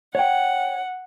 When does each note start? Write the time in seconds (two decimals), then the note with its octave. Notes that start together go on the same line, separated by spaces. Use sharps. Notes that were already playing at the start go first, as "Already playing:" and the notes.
0.15 C#5 F#5 G5